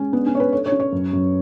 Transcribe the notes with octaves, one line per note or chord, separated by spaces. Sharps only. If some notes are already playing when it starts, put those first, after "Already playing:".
Already playing: G#3 C#4
B3 D4
C#4
D4 C#5
B4
A4 C#5
C#5
C#4
C#5
F#2
F#2